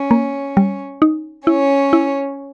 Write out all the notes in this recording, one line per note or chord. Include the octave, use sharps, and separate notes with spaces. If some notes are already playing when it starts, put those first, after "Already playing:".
Already playing: C#4 C#5
A#3
G3
D#4
C#4 E4 C#5
E4